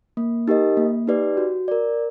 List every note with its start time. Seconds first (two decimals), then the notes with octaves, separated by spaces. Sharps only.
0.17 A#3
0.48 D#4 G4 A#4 D#5
0.77 A#3
1.07 D#4 G4 B4 D5
1.37 F#4
1.68 A#4 D5